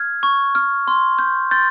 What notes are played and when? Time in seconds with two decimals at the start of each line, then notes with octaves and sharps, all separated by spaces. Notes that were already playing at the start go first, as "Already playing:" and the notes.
Already playing: F6 G#6
0.23 C#6
0.55 F6
0.88 C6
1.19 G6
1.51 C6 G6 A6